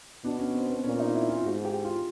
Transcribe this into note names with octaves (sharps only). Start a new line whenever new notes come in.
B2 D4
C#4
C4
B3
A#2 C#4
D#4
E4
F4
G#2 F#4
G4
F4